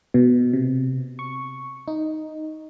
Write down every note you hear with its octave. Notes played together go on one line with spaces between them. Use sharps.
B2
C3
C#6
D#4